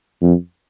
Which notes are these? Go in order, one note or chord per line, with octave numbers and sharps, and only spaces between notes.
F2